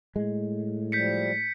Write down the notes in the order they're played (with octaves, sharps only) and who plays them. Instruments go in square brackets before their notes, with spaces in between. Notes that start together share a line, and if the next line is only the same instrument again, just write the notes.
[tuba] A2 [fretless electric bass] G#3
[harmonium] F3 G3 [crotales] G6 B6 C#7